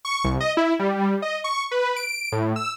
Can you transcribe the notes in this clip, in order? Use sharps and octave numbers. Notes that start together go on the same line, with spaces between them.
C#6
C2
D#5
E4
G3
D#5
C#6
B4
D7
A2
E6